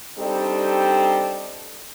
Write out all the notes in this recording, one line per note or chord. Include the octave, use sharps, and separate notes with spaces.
G3 C4 D4 D#4 G4 A4